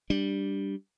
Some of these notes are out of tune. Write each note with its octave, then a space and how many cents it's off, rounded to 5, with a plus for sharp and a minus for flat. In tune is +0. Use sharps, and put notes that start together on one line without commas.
G3 +0 D4 +0